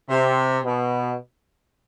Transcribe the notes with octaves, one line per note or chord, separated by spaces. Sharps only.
C3
B2